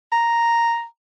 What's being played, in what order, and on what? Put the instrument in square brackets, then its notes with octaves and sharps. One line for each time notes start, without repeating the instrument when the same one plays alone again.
[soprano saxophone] A#5